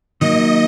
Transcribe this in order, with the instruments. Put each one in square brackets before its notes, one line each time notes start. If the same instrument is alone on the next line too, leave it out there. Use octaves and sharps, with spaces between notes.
[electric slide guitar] D#3 F#3 A#3 [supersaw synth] D#5